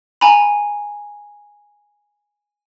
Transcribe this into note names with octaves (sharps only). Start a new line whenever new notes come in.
G#5 A#5 B5